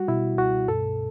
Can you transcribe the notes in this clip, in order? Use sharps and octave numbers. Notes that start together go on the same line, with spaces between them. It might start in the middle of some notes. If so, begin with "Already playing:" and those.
Already playing: G3 F#4
B2 E4
C#2 F#4
G2 A4